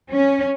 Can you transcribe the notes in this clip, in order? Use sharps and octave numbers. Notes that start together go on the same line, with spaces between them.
C#4